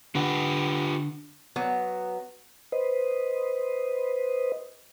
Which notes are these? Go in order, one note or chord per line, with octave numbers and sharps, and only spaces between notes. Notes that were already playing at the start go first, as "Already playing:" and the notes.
D3 F4 G4 B4 F#5
F#3 B3
B4 C5 D#5